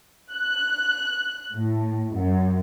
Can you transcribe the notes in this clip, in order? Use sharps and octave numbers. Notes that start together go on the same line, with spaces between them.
F#6
A2
F#2